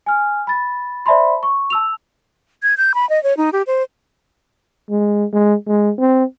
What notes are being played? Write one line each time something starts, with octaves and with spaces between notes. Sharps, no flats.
G#5 F6
B5 A6
C5 D5 E5 A5 B5 C6
C#6
A5 E6 F7
G#6
G6
B5
D#5
C#5
D#4
G4
C5
G#3
G#3
G#3
C4